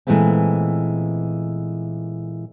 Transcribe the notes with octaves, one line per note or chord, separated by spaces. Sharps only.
A#2 E3 G#3 A3 B3 C4